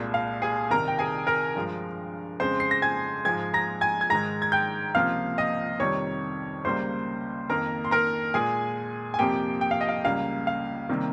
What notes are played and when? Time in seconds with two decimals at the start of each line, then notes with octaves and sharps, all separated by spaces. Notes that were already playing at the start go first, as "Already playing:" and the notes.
Already playing: C2 A#2 G#3
0.14 F5
0.42 G#4 G#5
0.70 C2 C3 D#3 A#4 A#5
0.88 G5
0.99 G#4 G#5
1.27 A#4 A#5
1.55 G2 F3 G#3
2.40 F2 C#3 G#3 C5 C6
2.60 C7
2.71 A#6
2.82 G#5 G#6
3.25 G#2 F3 G#3 G#5 G#6
3.54 A#5 A#6
3.81 G#5 G#6
4.01 G#6
4.10 G#2 D#3 G#3 A#5 A#6
4.42 G#6
4.52 G5 G6
4.95 C#2 C3 F3 A#3 F5 F6
5.38 D#5 D#6
5.79 F2 C3 D#3 G3 C#5 C#6
6.65 C#2 C#3 G3 A#3 C5 C6
7.50 F2 D#3 A#3 A#4 A#5
7.85 C6
7.91 A#4 A#5
8.34 A#2 G#3 G#4 G#5
9.14 G#5
9.19 F2 C3 F3 A#3 G4 G5
9.61 G5
9.71 F5
9.81 D#5
9.89 F5
10.04 C#2 C#3 G3 A#3 F5
10.47 F5
10.89 C3 D#3 G3 A#3